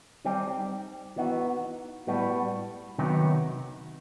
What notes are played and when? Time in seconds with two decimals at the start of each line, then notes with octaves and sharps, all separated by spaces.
0.25 G3 C4 D#4 G4
1.16 E3 B3 D#4 F#4
2.07 A2 G3 B3 F#4
2.98 C3 D#3 F#3 B3 D#4